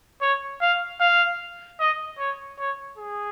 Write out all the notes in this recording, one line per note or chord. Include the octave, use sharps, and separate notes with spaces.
C#5
F5
F5
D#5
C#5
C#5
G#4